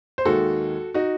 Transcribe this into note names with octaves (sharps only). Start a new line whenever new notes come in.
C5
D#2 D#3 G#3 F#4 A4
D#4 F#4